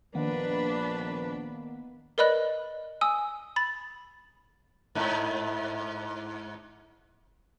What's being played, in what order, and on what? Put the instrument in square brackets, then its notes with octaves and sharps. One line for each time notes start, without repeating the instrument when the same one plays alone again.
[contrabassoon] A#1 [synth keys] D#3 A#3 B3 [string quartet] D4 [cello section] B4
[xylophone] A#4 B4 D5 D#5 B5 F#6
G#5 D#6 E6
B5 A6
[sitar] G#2 D#4 E4